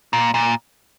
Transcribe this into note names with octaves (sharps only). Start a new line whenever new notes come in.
A#2
A#2